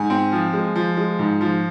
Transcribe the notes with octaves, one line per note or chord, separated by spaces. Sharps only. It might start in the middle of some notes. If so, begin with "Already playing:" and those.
Already playing: G#2 G#5
C4
F3
G#3
F3
G#3
G#2
F3